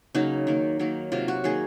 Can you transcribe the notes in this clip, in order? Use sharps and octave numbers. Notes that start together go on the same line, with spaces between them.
C#3 F#3 A#3 D#4
D#3 A#3
D#3 F#3 A#3
C3 F#3 A#3 F4
F#4
D#3 F#3 A#3 G#4